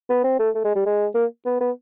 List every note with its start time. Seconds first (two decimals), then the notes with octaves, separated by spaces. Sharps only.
0.10 B3
0.24 C4
0.39 A3
0.55 A3
0.64 G#3
0.75 G3
0.86 G#3
1.15 A#3
1.45 B3
1.60 B3